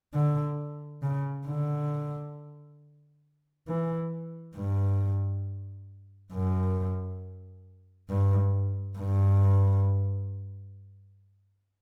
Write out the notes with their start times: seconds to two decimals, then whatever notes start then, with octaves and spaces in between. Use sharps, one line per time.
0.14 D3
1.03 C#3
1.47 D3
3.68 E3
4.57 G2
6.33 F#2
8.10 G2
8.98 G2